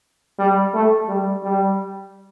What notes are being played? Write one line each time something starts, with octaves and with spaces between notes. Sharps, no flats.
G3
A3
G3
G3